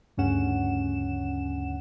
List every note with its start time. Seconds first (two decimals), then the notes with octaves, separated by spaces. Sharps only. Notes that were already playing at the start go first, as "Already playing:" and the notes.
0.17 D2 G2 C#3 C#4 F#5 E7